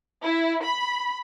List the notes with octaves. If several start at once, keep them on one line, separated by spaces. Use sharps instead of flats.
E4
B5